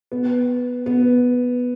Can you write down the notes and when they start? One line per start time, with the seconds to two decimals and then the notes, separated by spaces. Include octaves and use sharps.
0.12 B3
0.86 B3